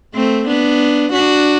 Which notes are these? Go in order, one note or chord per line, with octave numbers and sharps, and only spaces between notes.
A3 C4
B3 D4
D4 F#4